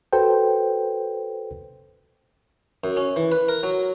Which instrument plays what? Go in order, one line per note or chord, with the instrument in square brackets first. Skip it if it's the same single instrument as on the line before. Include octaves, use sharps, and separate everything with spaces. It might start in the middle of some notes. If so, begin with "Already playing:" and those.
[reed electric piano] F#4 A4 B4 C5 G5
[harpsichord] F#2
C#4
E3
B4
A#4
F#3